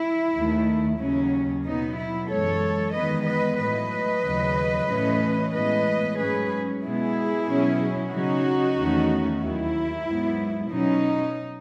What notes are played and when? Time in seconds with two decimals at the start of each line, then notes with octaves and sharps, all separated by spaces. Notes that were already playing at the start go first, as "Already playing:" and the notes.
Already playing: E4
0.35 D#2 D#3 A3
0.99 D#2 C#3 F#3 C#4
1.64 B2 F#3 B3 D#4
1.97 E4
2.30 F#2 E3 G#3 A4 C#5
2.93 E2 D#3 G#3 B3 B4 D#5
3.26 B4 D#5
3.59 A2 F#3 A3 B4 D#5
4.24 D#2 C#3 F#3
4.88 A2 E3 A3 C#4
5.53 A2 E3 G#3 B3 B4 D#5
6.18 G#2 F#3 C#4 G#4 B4
6.83 B2 G#3 B3 E4 G#4
7.48 B2 F#3 C#4
8.12 C#3 F#3 C#4 D#4 F#4
8.77 E2 D#3 A3 C#4
9.42 D#2 D#3 F#3 E4
10.07 G#2 F#3 B3
10.71 B2 F#3 C#4 D#4